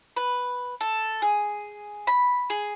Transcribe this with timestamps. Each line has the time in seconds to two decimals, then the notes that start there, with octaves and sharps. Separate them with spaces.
0.16 B4
0.81 A4
1.22 G#4
2.07 B5
2.50 G#4